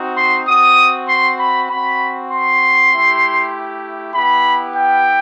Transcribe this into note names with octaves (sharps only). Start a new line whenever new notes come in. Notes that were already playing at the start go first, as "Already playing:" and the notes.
Already playing: C4 D#4 F#4
C6
C4 F#4 D#6
C6
B5
C4 F#4 B5
C6
A3 E4 G4
B3 E4 G4 B5
G5